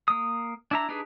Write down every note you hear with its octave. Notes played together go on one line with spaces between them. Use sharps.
A#3 D#6
D4 E4 A#5
D4 D#4 G4 G#4 B4